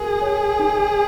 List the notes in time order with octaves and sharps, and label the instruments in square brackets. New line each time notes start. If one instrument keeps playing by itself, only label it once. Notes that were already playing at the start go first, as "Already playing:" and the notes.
Already playing: [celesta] F#4 A#4 [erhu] G#4
[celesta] C#5
D#4